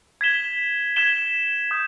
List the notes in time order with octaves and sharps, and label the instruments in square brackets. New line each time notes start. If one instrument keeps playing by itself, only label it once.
[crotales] G#6 B6 E7 G7
G#6 B6 E7 G7
D#6 G6